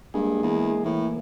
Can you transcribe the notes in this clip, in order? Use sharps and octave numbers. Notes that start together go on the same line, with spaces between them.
G2 G#3 A#3 G#4
E2
A2 E3 A#3